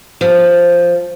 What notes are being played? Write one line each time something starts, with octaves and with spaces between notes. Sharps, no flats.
F3